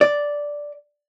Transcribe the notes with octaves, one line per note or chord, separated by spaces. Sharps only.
D5